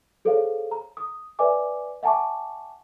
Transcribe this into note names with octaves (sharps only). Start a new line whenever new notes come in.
G#4 A4 C5 C#5 F5
A#5
D#6
B4 D5 E5 G#5 D6
E5 F#5 G#5 A5 C#6 D6